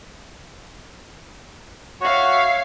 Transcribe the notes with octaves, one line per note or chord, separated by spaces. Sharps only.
F#4 C#5 E5 F5